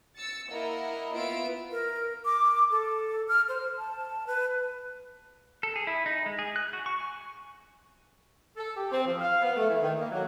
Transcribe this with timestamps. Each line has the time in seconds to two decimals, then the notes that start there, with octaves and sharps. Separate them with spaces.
0.18 E6 A6 C#7
0.49 A#3 E4 A#4 D#5 F#5
1.15 B3 E4 F4 B4 E6 D7
1.72 A#4
2.25 D6
2.71 A4
3.28 F6
3.49 C5
3.78 A5
4.27 B4
5.63 A4
5.76 G#4
5.87 E4
6.06 D#4
6.26 G#3
6.39 G#4
6.56 F#6
6.73 F#4
6.86 C#6
7.00 G#5
8.57 A4
8.76 G4
8.91 C4
9.05 F3
9.21 F5
9.42 B3
9.57 A3
9.69 E3
9.81 D#3
9.99 A#3
10.12 F#3